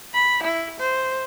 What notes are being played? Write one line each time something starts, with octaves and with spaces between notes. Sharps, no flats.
B5
E4
C5